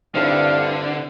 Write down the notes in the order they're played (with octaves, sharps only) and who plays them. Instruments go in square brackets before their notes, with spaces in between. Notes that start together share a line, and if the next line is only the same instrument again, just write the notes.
[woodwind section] G2 [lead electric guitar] D3 [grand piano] C4 E4 A4 [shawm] F5